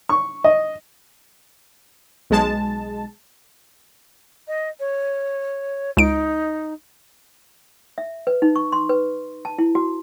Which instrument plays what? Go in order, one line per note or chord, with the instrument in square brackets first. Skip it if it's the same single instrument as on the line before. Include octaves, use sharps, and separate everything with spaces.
[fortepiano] C#6
D#5
[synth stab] B1 G#3 A5
[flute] D#5
C#5
[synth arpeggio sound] C#2 D7 [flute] D#4
[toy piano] E5
B4
D#4
C#6
C6
B4
A5
E4
F#4